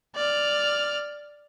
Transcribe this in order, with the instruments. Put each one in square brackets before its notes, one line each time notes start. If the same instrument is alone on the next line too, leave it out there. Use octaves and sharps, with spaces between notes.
[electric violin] D5 F6